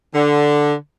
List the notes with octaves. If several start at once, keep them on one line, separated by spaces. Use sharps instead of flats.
D3